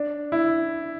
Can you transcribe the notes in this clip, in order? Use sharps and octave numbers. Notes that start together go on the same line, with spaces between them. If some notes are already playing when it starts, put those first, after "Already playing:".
Already playing: D4
E4